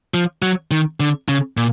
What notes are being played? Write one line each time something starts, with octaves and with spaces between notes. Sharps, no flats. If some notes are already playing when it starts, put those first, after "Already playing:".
F3
F#3
D#3
D3
C#3
A#2